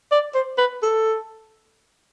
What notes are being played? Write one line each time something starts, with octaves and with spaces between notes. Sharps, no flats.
D5
C5
B4
A4